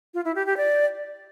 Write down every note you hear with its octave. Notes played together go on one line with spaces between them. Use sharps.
F4
E4
G4
G4
D5